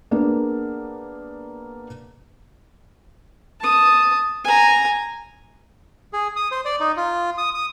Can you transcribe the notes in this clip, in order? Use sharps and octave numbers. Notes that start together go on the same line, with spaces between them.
A#3 B3 D4 G#4
A5 D#6
G#5 A#5
G#4
D#6
C5
D5
D#4
F4
D#6
D#6